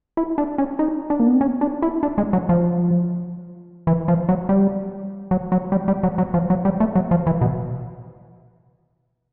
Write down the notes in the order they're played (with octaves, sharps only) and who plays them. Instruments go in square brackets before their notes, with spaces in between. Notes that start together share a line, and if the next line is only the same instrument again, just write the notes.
[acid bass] E4
D4
C#4
D#4
D4
A#3
B3
C4
C#4
D4
E4
D4
G#3
F#3
F3
E3
F3
F#3
G3
F#3
F#3
G3
G3
F#3
F#3
F3
F#3
G3
A3
F#3
F3
E3
B2